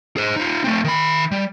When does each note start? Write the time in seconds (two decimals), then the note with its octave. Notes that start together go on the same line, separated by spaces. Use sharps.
0.17 G#4 C5
0.36 D#4 F4
0.64 A3 C4
0.85 D#3 B5
1.31 G3